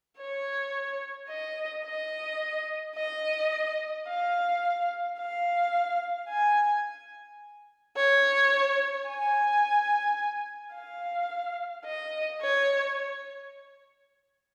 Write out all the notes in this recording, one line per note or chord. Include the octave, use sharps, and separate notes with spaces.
C#5
D#5
D#5
D#5
F5
F5
G#5
C#5
G#5
F5
D#5
C#5